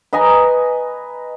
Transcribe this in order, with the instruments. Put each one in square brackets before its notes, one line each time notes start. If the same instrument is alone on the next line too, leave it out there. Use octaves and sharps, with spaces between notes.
[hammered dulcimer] B4 D#5 G#5 A#5